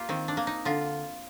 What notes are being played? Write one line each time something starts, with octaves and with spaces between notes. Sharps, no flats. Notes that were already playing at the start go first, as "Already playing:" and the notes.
Already playing: A#3 F4 G4
D#3 C4
D4
A#3
D#4
D3 F4